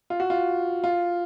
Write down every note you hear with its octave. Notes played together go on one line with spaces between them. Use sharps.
F4
F#4
F4
F4